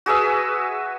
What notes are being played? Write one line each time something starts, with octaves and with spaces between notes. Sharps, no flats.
F#4 G#4 B4 E5